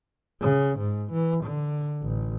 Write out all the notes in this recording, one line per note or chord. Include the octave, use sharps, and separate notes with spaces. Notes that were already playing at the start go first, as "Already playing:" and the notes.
C#3
G#2
E3
D3
A1